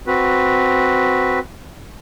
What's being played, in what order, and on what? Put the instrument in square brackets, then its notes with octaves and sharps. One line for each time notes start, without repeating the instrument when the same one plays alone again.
[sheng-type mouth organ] C4 F#4 B4